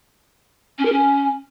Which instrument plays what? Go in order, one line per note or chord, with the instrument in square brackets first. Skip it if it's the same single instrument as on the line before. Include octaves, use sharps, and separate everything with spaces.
[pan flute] C#4
A#4
C#4